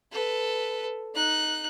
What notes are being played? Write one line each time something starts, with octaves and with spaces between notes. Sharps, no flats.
A4 B4
D#4 F#6